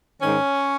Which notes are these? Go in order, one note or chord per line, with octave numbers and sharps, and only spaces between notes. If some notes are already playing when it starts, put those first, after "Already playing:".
G#2 D#3 C#4